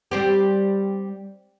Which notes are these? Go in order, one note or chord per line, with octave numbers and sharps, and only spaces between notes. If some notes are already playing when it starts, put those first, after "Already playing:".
G3 C4 G4